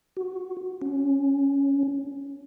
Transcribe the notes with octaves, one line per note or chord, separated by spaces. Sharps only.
F#4
C#4